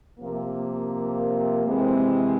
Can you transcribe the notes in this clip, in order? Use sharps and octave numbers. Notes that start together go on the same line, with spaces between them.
C3 F3 A#3
C3 E3 G#3 C4